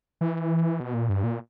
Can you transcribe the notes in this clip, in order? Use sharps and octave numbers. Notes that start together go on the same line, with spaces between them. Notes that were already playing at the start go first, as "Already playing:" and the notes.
E3
B2
A#2
G2
A#2